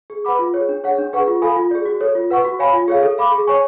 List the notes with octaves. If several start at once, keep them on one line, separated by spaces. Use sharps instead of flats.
G#4
B4 F#5 B5 D6
F4
G#4 C#5
D4
G#4 C#5 F#5
D4
G#4 B4 F#5 C#6
F4
A4 F5 G#5 B5
F4
G#4 D5
F#4
A4 C#5
F4
B4 F#5 C#6
F#4
C#5 F5 G#5 B5
F4
G#4 C#5 F5
A4
F5 B5 D6
G#4
C#5 G#5 C#6